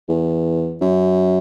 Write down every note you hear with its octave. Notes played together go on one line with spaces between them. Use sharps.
E2
F#2